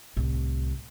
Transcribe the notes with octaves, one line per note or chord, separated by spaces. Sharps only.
C2 A2